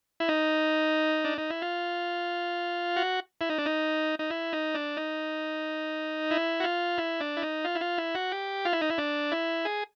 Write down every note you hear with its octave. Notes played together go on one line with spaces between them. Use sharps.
E4
D#4
D4
D#4
E4
F4
F#4
E4
D#4
D4
D#4
D#4
E4
D#4
D4
D#4
E4
F#4
F4
E4
D4
E4
D#4
F4
E4
F4
E4
F#4
G4
F4
E4
D#4
E4
D4
E4
G#4